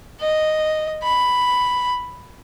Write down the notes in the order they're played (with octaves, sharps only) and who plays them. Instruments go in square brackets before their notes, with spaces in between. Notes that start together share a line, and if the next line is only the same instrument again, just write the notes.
[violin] D#5
B5